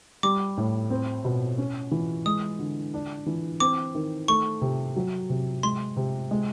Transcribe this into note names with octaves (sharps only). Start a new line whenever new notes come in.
G3 D6
A2
C4
B2
C#4
E3
G#3 D#6
D3
D4
E3
C4 D6
D#3
A3 C#6
C3
F#3
C3
G#3 C6
C3
G#3